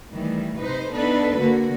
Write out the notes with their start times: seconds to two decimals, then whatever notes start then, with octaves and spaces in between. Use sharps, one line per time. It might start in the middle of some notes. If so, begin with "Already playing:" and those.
0.12 D#3 E3 G3 A3
0.59 C3 D#4 B4 C5
0.92 B3 D4 D#4 A4 B4
1.38 D3 A#3 F#4